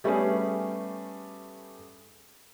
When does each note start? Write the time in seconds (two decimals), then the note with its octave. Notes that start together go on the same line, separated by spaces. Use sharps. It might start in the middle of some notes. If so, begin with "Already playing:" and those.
0.04 G3 A3 B3 C#4 G4 G#4